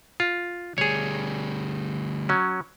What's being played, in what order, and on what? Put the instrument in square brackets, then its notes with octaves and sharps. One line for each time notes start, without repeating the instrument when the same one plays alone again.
[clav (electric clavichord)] F4
[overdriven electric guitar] D2 G3 [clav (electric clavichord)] G#4 C#5
[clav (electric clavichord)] F#3 C#4